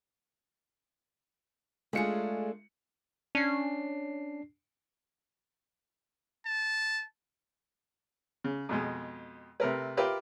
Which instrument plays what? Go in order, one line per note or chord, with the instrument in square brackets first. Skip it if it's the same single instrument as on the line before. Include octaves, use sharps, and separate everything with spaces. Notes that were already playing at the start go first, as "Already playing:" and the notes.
[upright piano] G#3 F4 C#7 [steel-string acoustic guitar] A3 D4 G#4
[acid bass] C#4 [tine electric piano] D4 C7
[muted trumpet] A5
[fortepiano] C#3
F2 B2 G#3
C3 A3 A#4 B4
F4 G4 A#4 B4 E5